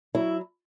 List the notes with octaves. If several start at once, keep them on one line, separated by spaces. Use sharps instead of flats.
F#3 E4